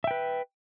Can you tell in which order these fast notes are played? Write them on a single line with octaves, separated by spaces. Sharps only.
E5 G5 B4